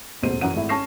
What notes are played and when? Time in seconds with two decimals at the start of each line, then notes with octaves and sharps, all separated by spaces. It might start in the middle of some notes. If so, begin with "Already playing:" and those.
0.22 D#1 A1 E2 B2 C5 D#7
0.41 F#2 E3 F#5 D#7
0.54 G#1 A3 E4
0.69 C#4 A5 C#6 A#6 C7 E7